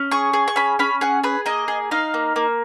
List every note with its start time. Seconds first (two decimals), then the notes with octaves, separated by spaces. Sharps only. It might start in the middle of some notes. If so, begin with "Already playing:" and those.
Already playing: C#4
0.11 G#4 C#6
0.33 G#4
0.48 C#6
0.56 C#4 B5
0.79 C#4 B5
1.01 G#4 F#5
1.24 G#4 B4
1.46 A#3 D#5
1.68 G#4
1.91 D#4 F5
2.14 A#3
2.36 A#3